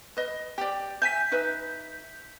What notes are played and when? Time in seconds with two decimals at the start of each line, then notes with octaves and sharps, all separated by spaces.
0.17 B4 D#5
0.58 G4 D5
1.02 E5 G#5 G6 B6
1.31 D#4 B4 E5